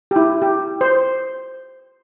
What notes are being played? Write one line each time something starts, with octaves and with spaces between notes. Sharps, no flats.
G4
E4
G4
C5